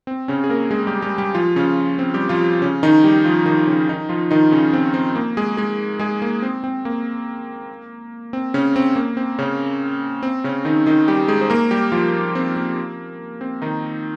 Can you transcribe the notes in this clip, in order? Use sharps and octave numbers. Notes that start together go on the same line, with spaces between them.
C4
C#3 C#4
G#4
A#3 A#4
G#3 G#4
G3 G4
G3 G4
G3 G4
F3 F4
C#3 C#4
C4
G3 G4
F3 F4
C#3 C#4
D#3 D#4
G3 G4
F3 F4
D#3 D#4
D#4
C#3 C#4
D#3 D#4
F3 F4
D#3 D#4
C#3 C#4
C4
C4
A#3
G#3 G#4
G#3 G#4
G#3 G#4
A#3
C4
C4
A#3
C4
C#3 C#4
C4
A#3
C4
C#3 C#4
C4
C#3 C#4
D#3 D#4
D#3 D#4
G3 G4
G#3 G#4
C5
A#3 A#4
G3 G4
F3 F4
C4
A#3
C4
D#3 D#4